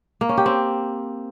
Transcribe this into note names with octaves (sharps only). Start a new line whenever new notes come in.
A#3
C#4
G4
C4